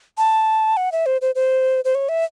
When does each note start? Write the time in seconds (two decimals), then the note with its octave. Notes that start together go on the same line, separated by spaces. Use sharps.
0.18 A5
0.77 F#5
0.92 E5
1.06 C5
1.21 C5
1.35 C5
1.85 C5
1.95 C#5
2.09 E5